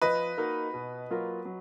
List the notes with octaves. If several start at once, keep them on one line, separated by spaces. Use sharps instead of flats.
F3 B4 D#5
A#3 D#4 F#4 A#4
B2
F#3 A#3 F4 A#4
F#3